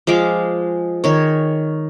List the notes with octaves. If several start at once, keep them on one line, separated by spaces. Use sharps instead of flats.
F3 G#3 F5 D6
D#3 C#5